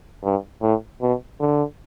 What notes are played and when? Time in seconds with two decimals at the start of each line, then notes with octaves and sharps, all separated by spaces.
0.24 G2
0.62 A2
1.01 B2
1.40 D3